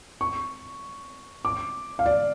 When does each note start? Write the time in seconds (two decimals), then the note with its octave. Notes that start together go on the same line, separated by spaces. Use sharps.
0.21 C#6
1.45 D6
1.99 F5
2.06 D5